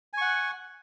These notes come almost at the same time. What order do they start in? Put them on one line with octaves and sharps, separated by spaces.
G#5 C#6 F#5